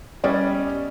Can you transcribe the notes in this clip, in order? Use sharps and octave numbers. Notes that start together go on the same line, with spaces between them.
G3 B3 C#4 D5 D#5